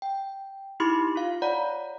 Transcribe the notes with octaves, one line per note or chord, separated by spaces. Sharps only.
G5
D#4 E4 G4 B5 C6 D6
F4 F5
C#5 D5 F#5 A#5 B5